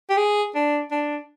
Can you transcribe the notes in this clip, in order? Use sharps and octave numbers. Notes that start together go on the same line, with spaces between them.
G4
G#4
D4
D4